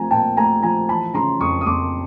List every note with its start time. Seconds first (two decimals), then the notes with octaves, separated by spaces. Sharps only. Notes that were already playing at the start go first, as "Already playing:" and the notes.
Already playing: F3 A3 C4 G#5 A#5
0.11 A#2 G5 A5
0.37 A3 G#5 A#5
0.63 F3 G#5 A#5
0.89 E3 A5 B5
1.14 C#3 A#5 C6
1.40 F2 C#6 D#6
1.61 D#6
1.66 F2 C6 D6